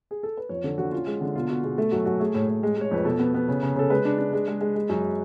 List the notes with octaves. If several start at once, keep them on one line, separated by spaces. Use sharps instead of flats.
G#4
A4
B4
F2 C#5
D3 A4
D3 F#4
C#4 F4
G#3
D3
B2 F4
B2 F#4
B2 G#4
A3 A4
F#2 F#4
F#2 F#4
A3 G#4
A2
A2
G#3
G#3 C#5
F2 B4
B2 A4
B3
B3
C#3
C#3
C#3 A4
G#3 B4
D4
D4
G#3
G#3
G#3
G#3
F#2